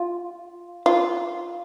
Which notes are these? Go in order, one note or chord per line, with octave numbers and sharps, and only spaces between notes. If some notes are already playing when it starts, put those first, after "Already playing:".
Already playing: F4
F4